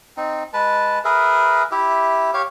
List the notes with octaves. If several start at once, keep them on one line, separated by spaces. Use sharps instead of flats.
C4 D#4
G#3 B4 A5
G#4 A#4 B4 E5
E4 G4 E5
G4 C#5 F5